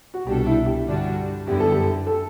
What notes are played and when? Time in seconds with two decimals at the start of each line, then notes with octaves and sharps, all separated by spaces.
0.14 F#4
0.26 C2 B2 G3 D4 G4 A4
0.47 E4
0.66 G4
0.87 G2 D3 G3 D4 F#4
1.47 F#2 D3 G3 B3 E4 G4
1.60 A4
1.72 G4
2.07 A4